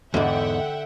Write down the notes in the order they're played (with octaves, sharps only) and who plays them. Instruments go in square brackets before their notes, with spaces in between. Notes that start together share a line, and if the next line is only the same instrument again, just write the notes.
[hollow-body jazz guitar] E2 G#2 [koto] D3 [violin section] E5 F#5 G5